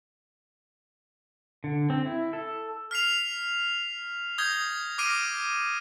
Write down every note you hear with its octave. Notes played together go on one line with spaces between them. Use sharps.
D3
C4
E4
A4
F6 B6 C7 F7
D#6 G6 G#6 A#6 G7
D6 F6 A#6 C7 D7 D#7